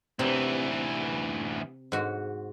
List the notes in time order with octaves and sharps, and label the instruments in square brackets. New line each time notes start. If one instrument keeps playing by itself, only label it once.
[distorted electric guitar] D2 E3 [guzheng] C3
[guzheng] G#2 F#4